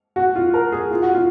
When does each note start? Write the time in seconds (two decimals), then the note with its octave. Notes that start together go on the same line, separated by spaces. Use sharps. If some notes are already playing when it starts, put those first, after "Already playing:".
0.16 F#4
0.36 F4
0.54 A#4
0.72 G#4
0.91 F4
1.02 F#4
1.14 F4